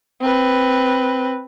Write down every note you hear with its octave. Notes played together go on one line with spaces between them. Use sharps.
C4 B4